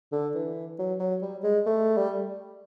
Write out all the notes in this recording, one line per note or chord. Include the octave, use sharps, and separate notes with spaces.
D3
E3
F#3
F#3
G3
G#3
A3
G3